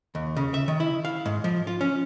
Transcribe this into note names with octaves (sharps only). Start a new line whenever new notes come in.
D#2
C#3
E5
D#3
E4
F5
G#2
F3
F4
C#4